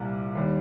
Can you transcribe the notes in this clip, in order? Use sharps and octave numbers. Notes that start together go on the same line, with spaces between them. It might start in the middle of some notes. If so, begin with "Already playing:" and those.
Already playing: C2 A#2 G3 A#3
D#2 D#3 G3